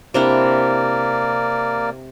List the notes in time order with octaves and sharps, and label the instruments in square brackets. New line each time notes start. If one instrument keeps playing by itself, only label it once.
[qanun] C3 D4 E4 [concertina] A#3 D5